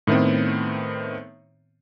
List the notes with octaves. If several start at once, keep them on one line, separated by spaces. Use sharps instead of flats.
A2 D#3 A3 B3 C4